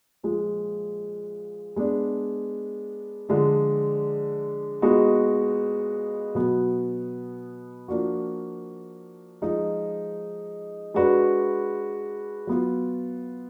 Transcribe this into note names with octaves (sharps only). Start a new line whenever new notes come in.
A#2 F3 G#3
G#3 B3 D4
D3 F3 G#3 D4
A#2 G#3 B3 D#4 F#4
B2 F#3 B3
F3 A#3 D4 F#4
F3 G#3 D#4
G#3 D4 F#4 B4
F#3 B3 F4